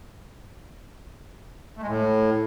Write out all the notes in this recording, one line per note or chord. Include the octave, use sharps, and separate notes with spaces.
A3
G#3
A2